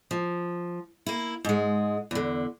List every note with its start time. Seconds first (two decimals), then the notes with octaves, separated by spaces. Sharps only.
0.11 F3
1.06 A#3 E4
1.45 G#2 G#3
2.11 E2 D3